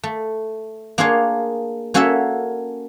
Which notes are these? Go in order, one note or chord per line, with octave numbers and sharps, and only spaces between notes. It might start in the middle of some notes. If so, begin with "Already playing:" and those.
A3
A#3 D4 F4 G#4 C#5 F5
A#3 C#4 F#4 A4 C#5 E5